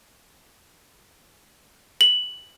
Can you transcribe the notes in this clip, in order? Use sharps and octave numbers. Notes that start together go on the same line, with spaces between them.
F#7